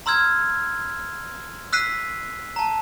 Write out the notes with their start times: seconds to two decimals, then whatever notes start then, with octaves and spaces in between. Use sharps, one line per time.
0.06 A#5 C6 E6 F6 G#6
1.73 E6 F#6 B6 C7 D#7
2.56 A5 A#5